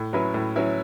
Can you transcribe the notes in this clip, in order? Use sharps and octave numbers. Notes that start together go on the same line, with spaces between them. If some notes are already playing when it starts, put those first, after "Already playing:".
Already playing: A2
F#3 C#4 E4 B4
A2
F#3 C#4 E4 B4